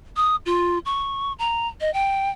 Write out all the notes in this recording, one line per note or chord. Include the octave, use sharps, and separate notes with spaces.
D#6
F4
C#6
A#5
D#5
G5